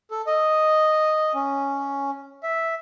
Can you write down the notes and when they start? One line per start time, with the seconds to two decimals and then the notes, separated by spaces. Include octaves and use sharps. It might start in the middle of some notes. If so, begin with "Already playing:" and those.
0.11 A4
0.27 D#5
1.34 C#4
2.43 E5